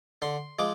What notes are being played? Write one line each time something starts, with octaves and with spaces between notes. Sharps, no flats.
D3 C6
F3 G#3 D6